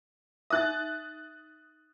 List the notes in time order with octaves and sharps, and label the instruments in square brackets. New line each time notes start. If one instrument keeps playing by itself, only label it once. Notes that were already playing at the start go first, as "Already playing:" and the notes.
[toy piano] D#4 E5 [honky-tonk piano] D#6 F#6 A6